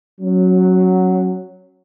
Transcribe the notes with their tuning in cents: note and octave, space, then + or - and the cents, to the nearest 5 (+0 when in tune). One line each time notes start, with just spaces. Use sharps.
F#3 +0 C#4 -20